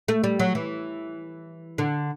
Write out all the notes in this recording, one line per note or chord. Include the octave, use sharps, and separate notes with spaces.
A3
G3
F#3
E3
D3